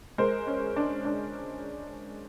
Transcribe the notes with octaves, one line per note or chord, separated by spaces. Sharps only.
G#3 A#4 C5
C#4
D4
D4